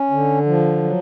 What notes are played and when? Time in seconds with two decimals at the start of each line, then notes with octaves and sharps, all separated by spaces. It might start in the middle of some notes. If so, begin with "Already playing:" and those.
Already playing: C#4
0.11 D3
0.46 F3
0.83 F#3